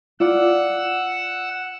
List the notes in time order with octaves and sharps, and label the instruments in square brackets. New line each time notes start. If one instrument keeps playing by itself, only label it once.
[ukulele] F4 D5 [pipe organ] F#5 E6